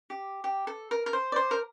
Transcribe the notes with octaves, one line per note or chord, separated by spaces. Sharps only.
G4
G4
A4
A#4
A#4
C5
D5
C5
A#4